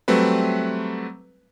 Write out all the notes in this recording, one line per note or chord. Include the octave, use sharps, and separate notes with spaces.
F#3 G3 A3 C4 B4